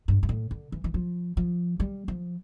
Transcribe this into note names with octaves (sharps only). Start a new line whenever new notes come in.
G2
G2
A2
D3
E3
E3
F3
F3
G3
F3